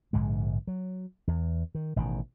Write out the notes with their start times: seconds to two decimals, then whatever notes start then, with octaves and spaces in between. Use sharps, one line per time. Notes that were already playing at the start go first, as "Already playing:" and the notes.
0.13 A#1 G#2 D3 G#3
0.67 F#3
1.27 E2
1.75 D#3
1.96 A1 B2 D3 D#3